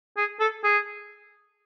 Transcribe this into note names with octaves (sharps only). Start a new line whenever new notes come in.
G#4
A4
G#4